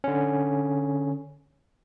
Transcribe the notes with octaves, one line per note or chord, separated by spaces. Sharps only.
D3 C#4